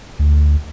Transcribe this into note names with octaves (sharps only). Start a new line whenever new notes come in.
D2